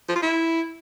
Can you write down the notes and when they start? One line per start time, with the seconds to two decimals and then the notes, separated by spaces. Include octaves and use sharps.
0.09 F3
0.16 F4
0.22 E4